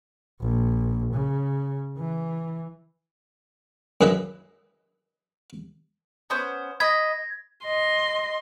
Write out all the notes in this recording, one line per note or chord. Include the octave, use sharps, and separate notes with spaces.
A#1
C#3
E3
F#2 G#4 B4 D#5 E5
B3 C#4 C5
D#5 B5 G#6 A#6
D#5 C6